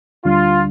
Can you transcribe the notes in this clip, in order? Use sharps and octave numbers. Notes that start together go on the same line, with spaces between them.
D2 D3 G3 D4 F4